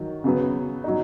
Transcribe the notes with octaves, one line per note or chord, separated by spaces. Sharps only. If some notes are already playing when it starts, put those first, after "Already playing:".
Already playing: D#3 F#3 D#4
C#3 F#3 B3
F#3 D#4